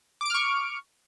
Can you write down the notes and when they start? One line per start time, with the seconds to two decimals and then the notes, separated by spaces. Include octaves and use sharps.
0.21 D6
0.25 D7
0.30 F6
0.34 C#6